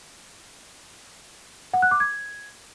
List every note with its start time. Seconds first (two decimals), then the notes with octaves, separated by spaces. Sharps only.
1.74 F#5
1.82 F#6
1.91 D6
2.00 G#6